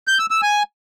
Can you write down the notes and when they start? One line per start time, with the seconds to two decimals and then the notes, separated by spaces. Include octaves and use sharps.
0.08 G6
0.19 E6
0.31 E6
0.42 G#5